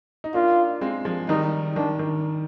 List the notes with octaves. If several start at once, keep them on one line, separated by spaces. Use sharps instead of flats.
D#4
A#3 D4 F4
G#3 C4
F3 G#3
D#3 G3 D#4
D#3 D4
D#3